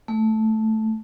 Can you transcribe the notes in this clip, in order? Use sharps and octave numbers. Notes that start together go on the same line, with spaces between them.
A3